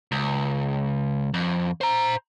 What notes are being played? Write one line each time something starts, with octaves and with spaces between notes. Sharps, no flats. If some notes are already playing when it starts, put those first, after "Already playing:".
C#2
F2
C5 A#5